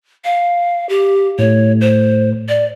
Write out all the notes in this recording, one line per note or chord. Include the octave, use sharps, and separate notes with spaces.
F5
G4
A2 A3 C#5
C5
D5